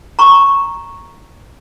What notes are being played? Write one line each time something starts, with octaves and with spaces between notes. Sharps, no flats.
A#5 C#6